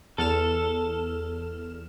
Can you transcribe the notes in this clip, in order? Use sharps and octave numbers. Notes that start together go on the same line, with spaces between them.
E2 A4 F6 E7